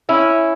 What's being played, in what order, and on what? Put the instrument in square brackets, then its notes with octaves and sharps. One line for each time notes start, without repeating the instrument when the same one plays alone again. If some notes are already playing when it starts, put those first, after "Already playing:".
[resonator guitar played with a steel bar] C#4 E4